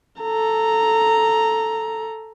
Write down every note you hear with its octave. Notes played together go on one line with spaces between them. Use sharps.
A4 A#5